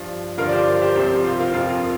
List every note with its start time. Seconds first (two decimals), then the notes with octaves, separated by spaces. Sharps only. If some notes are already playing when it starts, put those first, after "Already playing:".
Already playing: G2 F3
0.37 G2 D3 F3 F4 A#4
0.49 D5
0.52 G4 C5
0.82 G4 C5
0.96 C2 C3 F3 G4 C5
1.24 F4
1.40 F4 A#4
1.54 F2 F3 F4 A#4